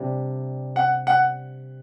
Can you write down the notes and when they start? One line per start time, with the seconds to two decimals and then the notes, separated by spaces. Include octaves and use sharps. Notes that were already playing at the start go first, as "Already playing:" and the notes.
Already playing: C3 G3 D4
0.76 F#5
1.07 F#5